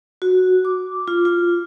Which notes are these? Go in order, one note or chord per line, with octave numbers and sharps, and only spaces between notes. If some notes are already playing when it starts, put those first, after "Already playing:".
F#4
D6
F4
F4